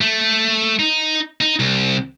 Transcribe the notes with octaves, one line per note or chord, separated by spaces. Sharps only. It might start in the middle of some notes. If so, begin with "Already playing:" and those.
A3
D#4
D#4
C2